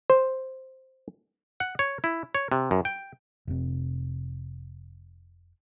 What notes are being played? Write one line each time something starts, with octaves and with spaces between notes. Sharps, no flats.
C5
F#5
C#5
E4
C#5
C3
F#2
G5
F1 C3